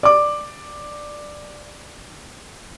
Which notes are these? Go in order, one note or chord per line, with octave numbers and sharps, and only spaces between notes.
D5 D6